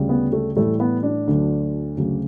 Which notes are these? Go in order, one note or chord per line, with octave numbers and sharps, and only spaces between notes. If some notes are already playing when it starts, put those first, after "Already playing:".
Already playing: D2 C#3 G3
B3
A3
A2 E3 G3 A3
B3
D4
D2 D3 F#3
D2 C#3 F#3